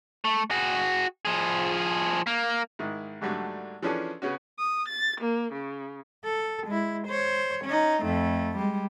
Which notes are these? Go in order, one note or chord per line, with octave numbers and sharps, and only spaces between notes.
A3
F#4 G#4
F3 G#4
A#3
G#2 D#3 E4
G#2 D3 F#3 G3 A3 D4
E3 F3 C#4 D4 G#4 A4
C#3 B3 C#4 F#4
D#6
A6
A#3
C#3
A4
G#3 E4
C5 C#5
C#4 D#4
F2 A3
G3 G#3